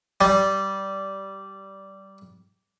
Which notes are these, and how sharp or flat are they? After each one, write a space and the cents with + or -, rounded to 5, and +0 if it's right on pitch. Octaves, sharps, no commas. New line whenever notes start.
G3 -15